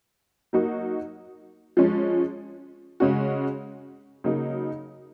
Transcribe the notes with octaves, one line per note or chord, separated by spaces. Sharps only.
F#3 A#3 D#4 F#4
F3 G#3 C#4
C#3 G#3 C#4 F#4
C#3 F#3 A#3 D#4